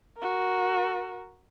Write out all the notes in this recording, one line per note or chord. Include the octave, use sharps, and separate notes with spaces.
F#4 A#4